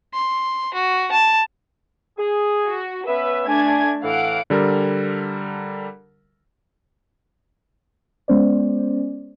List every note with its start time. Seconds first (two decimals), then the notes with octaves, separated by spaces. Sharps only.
0.14 C6
0.74 F#4
1.12 A5
2.18 G#4
2.67 F#4
3.08 B3 C#4 B4 E5
3.47 A3 D4 G#5 G#6
4.03 A2 E3 F5 F#5 D7
4.50 D3 G3 A4 A#4
8.28 G#3 B3 C#4 C5 D5